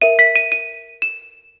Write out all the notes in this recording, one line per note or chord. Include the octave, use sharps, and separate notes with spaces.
A#4 E5 D#7
B6
D#7
D#7
E7